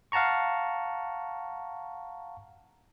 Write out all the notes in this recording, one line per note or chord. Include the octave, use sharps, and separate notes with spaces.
F5 F#5 A5 A#5 C#6